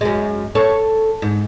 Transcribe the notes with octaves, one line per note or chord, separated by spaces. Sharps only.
F#2 G#3
A4 C#5
G#2